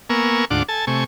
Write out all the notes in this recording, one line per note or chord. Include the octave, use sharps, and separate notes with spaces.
A#3 B3 A#4 G#5 C#6 E6
D2 G#2 D4 F4 F#5 D6
A4 G#5 A5
C3 A3 G#5 C#6